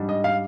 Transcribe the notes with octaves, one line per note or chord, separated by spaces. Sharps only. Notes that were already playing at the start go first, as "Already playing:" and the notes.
Already playing: G#2 G3 D4
D#5
F5